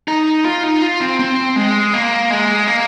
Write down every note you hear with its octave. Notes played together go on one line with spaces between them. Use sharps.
D#4
F4
D#4
F4
C4
C4
G#3
A#3
G#3
A#3